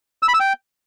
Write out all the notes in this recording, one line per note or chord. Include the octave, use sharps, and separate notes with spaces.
E6
B5
E6
G5